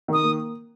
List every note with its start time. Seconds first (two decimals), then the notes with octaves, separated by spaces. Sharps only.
0.08 D#3 D#6
0.23 A#3